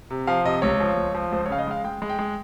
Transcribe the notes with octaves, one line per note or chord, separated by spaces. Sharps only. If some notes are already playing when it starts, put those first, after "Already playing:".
C3
F3 F5
C3 D#5
C#2 C#5
F3
C#2
F3
C#2 C5
C#5
C#3 F5
D#5
G#3 F5
G#3 G5
G#3
G5
G#3